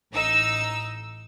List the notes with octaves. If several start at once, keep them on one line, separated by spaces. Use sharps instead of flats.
A1 D#4 E6